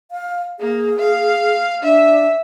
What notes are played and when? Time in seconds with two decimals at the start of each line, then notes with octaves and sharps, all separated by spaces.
0.11 F5
0.60 A#3 G#4
0.99 F5
1.83 D4 E5